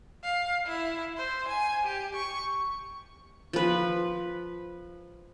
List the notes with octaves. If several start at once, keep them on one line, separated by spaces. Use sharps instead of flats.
F5
E4
C5
G#5
G4
C#6
F3 B4